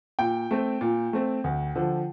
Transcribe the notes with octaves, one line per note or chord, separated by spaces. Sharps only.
A#2 G5
A3 C4
A#2
A3 C4
D2
D3 F3